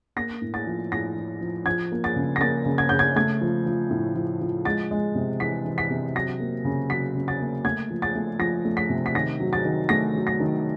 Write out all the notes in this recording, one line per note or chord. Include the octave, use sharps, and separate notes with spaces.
A#3 A#6
A2
A6
F3
A2 A#6
F3
F3
F3 G#6
A#3
A6
C#3
A#6
A#3 A6
C#3
G#6
C#3 G6
G#6
A3 G#6
F3
F3
A2
F3
F3
G#3 A6
G#3
C3
E3 B6
E3
B6
C3
F#3 A#6
A#3
C#3
F#3 B6
C#3
A6
A#3
A3 G#6
F3
A6
A3
F3 A#6
A3
B6
C3
B6
D#3 A#6
F#3
A6
D#3
A3 A#6
F#3
A#6
D#3